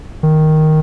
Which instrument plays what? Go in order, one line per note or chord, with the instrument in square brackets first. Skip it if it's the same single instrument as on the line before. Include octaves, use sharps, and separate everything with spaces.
[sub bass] D#3